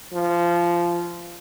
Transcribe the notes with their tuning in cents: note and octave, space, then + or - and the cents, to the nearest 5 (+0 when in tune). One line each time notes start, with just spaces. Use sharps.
F3 -15